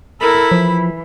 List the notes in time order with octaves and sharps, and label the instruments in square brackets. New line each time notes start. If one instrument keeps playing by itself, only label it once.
[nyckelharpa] E4 B5 [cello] A4 A#4
[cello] E3 [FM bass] F3